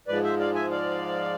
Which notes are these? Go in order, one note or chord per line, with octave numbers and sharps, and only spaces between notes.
G#2 F3 G#3 B4 D5
C5 E5
D5 F5
E5 G#5
D5 F5